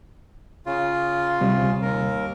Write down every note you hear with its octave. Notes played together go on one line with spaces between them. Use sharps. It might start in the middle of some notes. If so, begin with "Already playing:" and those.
C#3 F4
D2 C3 G3
D#2 A#4